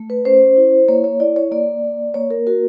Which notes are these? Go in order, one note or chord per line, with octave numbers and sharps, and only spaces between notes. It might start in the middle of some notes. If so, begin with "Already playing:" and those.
Already playing: A3
B4
C#4 C5
E4
A#3 C#5
C#5
E4 D5
C#5
A#3 D5
A#3
A#3 C#5
A#4
F#4 A#4